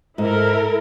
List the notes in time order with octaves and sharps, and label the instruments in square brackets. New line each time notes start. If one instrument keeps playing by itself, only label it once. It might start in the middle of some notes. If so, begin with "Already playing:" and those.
[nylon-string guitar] G#2 [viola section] E4 A4 A#4